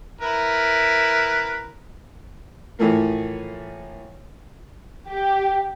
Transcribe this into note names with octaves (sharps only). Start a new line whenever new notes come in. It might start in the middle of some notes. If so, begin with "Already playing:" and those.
E4 A#4 B4
A2 E3 F3 A3 A#3
G4